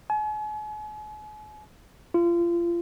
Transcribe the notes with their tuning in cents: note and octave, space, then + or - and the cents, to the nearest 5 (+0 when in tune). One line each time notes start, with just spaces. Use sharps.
G#5 +40
F4 -30